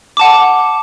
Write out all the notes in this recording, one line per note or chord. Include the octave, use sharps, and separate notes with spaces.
F#5 A5 D6